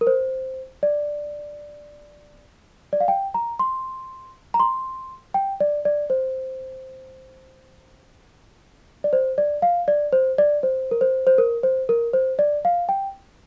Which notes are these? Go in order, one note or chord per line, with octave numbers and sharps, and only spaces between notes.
A#4
C5
D5
D5
F5
G5
A#5
C6
A#5
C6
G5
D5
D5
C5
D5
C5
D5
F5
D5
C5
D5
C5
A#4
C5
C5
A#4
C5
A#4
C5
D5
F5
G5